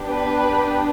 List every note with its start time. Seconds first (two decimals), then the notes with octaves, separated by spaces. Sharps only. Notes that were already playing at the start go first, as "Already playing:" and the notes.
Already playing: B3 D4 G4
0.09 B4